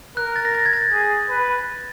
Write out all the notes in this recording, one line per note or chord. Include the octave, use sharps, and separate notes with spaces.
A#4 F#6
A6
A#6
A6
G#6
A6
G#4
B4